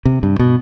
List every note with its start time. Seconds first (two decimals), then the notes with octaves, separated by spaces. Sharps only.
0.05 C3
0.23 G2
0.39 B2